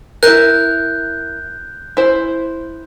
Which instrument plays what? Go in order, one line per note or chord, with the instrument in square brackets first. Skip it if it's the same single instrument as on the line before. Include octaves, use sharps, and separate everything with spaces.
[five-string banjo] E4 A#4 [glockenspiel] F#6 G6
[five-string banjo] E4 C5